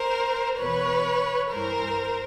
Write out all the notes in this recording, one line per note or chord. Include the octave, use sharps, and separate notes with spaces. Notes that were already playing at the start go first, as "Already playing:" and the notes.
Already playing: A#4 C5
E2 B2 B4 C#5
G2 E3 A#4 C5